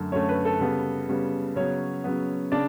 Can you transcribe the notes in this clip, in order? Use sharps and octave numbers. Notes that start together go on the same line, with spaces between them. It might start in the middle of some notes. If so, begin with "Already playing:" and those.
Already playing: F#2 D3 A3
F#2 D3 A3 C#4 C#5
B4
A4
C#3 G3 B3
C#3 G3 B3
C#3 F#3 B3 C#4 C#5
C#3 F#3 B3
C#3 D4 D5